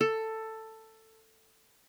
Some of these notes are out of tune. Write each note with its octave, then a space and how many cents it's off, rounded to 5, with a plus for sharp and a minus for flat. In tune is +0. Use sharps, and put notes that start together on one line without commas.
A4 +10